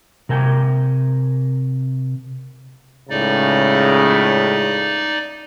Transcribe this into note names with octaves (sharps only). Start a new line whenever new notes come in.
C3 A#4 G5 G#5
C#2 A2 C#3 D#4 D5